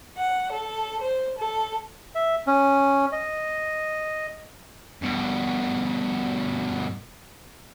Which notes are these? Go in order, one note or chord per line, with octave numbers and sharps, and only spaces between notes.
F#5
A4
C5
A4
E5
C#4
D#5
G2 B2